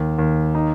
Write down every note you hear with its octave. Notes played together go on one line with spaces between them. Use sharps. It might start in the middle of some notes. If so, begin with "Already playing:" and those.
Already playing: D#2
D#2
D#4